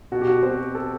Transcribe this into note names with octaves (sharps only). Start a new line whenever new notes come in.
B2 F#4
G4
F#4
C4 F#4
A4